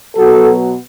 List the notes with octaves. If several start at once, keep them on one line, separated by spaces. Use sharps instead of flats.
B2 F#3 B3 F#4 A4